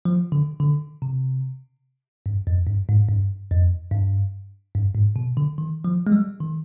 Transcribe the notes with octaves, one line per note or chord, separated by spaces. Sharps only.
F3
D3
D3
C3
G2
F2
G2
G#2
G2
F2
G2
G2
G#2
B2
D3
D#3
F3
G#3
G3
D#3